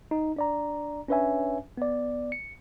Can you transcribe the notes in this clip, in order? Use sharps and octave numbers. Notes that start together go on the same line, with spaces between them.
D#4
D4 D5 A#5
C#4 D4 B4 C#5 E5 G#5
B3 D5
C#7